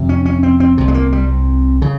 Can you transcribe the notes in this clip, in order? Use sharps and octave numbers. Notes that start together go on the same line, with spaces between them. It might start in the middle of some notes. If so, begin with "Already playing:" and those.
Already playing: F2 C3
C#4
C#4
C4
C4
C2 C3
G#3
A#3
G3
C#3